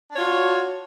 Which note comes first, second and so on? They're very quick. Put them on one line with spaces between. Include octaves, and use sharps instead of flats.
D4 C#5 F4 F#4